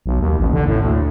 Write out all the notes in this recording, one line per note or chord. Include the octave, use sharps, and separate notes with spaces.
B1
D#2
A1
D3
A2
D2